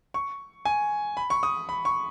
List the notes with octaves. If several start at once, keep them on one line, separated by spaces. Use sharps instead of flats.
C#6
G#5
B5
C#6
D#6
B5
C#6